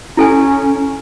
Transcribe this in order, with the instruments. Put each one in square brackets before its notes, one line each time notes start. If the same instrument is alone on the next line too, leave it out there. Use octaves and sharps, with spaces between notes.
[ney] C#4 [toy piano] E4 A4 G#5